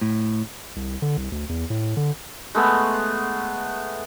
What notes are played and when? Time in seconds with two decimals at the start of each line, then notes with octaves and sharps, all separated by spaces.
0.01 A2
0.76 C2
1.02 D3
1.17 C2
1.32 D2
1.49 E2
1.70 A2
1.97 D3
2.55 G#3 A3 B3